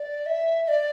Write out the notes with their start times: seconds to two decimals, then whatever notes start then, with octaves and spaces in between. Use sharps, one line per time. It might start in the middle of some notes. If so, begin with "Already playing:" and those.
Already playing: D5
0.26 E5
0.63 E5
0.68 D5